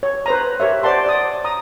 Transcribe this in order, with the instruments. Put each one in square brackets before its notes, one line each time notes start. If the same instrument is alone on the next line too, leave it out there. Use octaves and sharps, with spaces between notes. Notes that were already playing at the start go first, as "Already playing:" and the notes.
[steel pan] C#5
B4 C5 A#5
G4 A#4 C#5 E5
C5 D5 F#5 A5 C6
D5 D#6
A#5 D#6